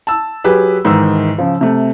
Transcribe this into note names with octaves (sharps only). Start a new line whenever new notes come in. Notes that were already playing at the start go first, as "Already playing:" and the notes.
A5 E6
F#3 G4 G#4 B4
G#2 D#3 E3 D#4 E6
C#3 F3
C3 A3